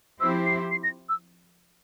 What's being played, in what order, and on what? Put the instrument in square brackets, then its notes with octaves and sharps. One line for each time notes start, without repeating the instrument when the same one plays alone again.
[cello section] F3 C4 E4 G4 C5 [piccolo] E6
[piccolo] C7
C7
A#6
E6